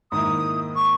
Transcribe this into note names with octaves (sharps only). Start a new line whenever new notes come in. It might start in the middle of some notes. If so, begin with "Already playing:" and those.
G#2 D#3 A#3 E4 D#6
C#6